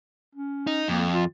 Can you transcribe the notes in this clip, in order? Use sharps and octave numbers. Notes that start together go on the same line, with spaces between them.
C#4
D#4
F2 A#3
F4